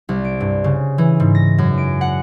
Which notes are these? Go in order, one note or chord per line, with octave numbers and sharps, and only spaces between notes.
C2
D7
G2
C#3
E3
G#2
A#6
F#2
D7
F#5